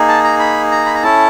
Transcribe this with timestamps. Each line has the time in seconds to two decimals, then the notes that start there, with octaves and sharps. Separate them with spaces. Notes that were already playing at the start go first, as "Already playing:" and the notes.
Already playing: A#3 D#4 G#4
0.08 A5
0.24 A#5
0.39 B5
0.71 A#5
0.86 B5
0.94 A#5
1.03 C#4 E4 A4 A5